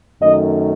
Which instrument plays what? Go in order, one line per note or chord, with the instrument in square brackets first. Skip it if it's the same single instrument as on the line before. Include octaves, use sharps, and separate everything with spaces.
[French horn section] F#2 D#3 A3 D#5